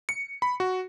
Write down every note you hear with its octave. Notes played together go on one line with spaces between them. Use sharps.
C#7
B5
F#4